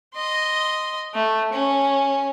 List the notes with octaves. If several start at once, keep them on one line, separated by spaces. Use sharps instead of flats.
D#5 C6
A3
C#4